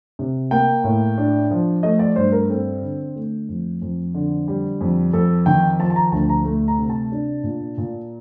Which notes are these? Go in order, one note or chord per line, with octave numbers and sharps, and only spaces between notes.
C3
A#3 G5
A2
D4
F3
A3 D#5
D5
G2 C5
A#4
C4 A4
D3
A3
F2
F2
D3
G3
F2
F2 A4
D#3 G5
F3 A5
A5
A#5
D2 A5
A#5
A3
A#5
C3
A5
D4
A#2
A#2